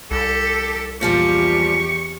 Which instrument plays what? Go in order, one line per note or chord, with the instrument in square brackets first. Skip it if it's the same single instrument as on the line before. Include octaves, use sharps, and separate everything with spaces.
[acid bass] C2 [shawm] G4 [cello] A4
[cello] E2 G4 [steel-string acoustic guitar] A#2 F3 G3 [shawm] C#6